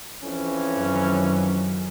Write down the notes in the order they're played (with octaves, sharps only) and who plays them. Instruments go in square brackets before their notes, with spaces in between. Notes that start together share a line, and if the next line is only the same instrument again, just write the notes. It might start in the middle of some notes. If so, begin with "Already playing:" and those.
[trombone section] F2 E3 C#4
[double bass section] F#2 D#3 F#3